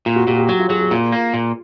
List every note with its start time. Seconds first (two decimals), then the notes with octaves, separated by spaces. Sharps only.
0.06 A#2 F4
0.16 F#4
0.27 A#2 G4
0.38 G4
0.49 F#3 F#4
0.59 F4
0.70 F#3 G#4
0.81 G#4
0.91 A#2 F4
1.12 A#3
1.34 A#2